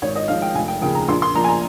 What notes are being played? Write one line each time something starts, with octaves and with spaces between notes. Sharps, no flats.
G#1 C#5
D#5
G#2 F3 F5
G5
F1 G#5
G5
D#2 C#3 F3 G5
A#5
A#1 C6
C6
A#2 F3 A#5
G#5
A#5